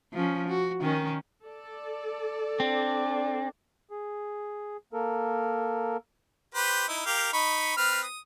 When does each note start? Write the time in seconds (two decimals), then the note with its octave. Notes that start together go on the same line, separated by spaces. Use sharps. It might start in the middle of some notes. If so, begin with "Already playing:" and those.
0.13 F3 C#4
0.48 F#4
0.81 D#3 C#4 D#4
1.46 A4 D5
2.60 C4 D4
3.90 G#4
4.93 A#3 A4 A#4
6.55 G4 B4 C5
6.88 D#4 E4
7.06 G4 A#4 F5
7.33 D#4 B5 C#6
7.77 C4 B4 F6
8.03 D#6